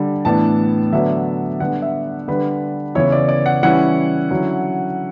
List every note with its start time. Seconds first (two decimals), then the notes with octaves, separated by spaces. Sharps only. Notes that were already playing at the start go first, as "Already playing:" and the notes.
Already playing: D3 G3 D4
0.25 A2 E3 B3 D4 A5
0.92 D3 F#3 B3 D4 E5
1.60 D3 G3 B3 D4 F#5
1.82 E5
2.28 D3 G3 D4 B4
2.95 C#3 E3 B3 E4 C#5
3.12 D5
3.29 D5
3.46 F#5
3.63 E3 G3 C#4 E4 F#5
4.30 D3 F#3 C#4 E4